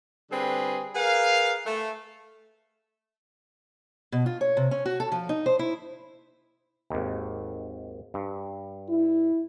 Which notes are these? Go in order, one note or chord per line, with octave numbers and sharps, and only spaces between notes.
D3 G3 C4 G#4 B4
G#4 A#4 B4 F5
A3
B2
F4
C#5
C3
C#4
F#4
A4
F3
D#4
C5
E4
G#1 D#2
G2
E4